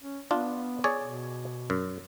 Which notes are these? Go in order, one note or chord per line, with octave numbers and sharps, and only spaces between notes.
C#4
B3 D4 F4
G#4 C#5 D5
B2
F#2